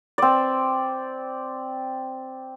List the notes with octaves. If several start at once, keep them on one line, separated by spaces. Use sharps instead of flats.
C4 D5